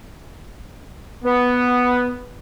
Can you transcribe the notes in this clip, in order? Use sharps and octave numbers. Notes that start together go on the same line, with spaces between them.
B3